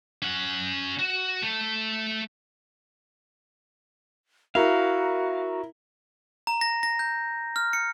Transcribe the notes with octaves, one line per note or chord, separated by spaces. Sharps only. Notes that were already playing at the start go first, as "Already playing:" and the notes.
C#4 F#5
F#4
A3
E4 F#4 A#4 F5
A#5
A#6
A#6
G6
F6
C#7